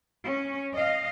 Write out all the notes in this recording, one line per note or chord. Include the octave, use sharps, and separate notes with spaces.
C#4
D#5 F5